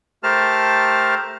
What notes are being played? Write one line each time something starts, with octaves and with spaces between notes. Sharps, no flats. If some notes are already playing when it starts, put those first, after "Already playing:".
A3 G4 A#4 C5 A5 F6